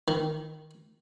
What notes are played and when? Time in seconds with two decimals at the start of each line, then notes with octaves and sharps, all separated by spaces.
0.08 D#3